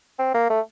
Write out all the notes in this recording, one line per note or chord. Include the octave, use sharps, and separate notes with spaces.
C4
A#3
A3